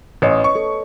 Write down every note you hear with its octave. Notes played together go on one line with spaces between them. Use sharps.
A1 B4 C#5 D#5
C#6
A4